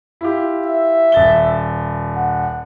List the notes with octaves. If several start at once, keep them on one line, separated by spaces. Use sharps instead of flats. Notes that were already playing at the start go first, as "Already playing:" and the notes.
E4 F4 G4
E5
D#1 A6 G7
F#5